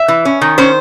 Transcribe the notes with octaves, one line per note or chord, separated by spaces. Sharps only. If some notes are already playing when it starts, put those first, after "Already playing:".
Already playing: E5
E3
C#4
D#3
C#4 C5